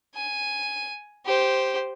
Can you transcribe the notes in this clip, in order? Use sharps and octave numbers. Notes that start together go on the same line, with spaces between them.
G#5
G4 C5